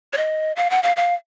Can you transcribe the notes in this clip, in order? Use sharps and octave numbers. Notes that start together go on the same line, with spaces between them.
C#5
D#5
F5
F#5
F5
F5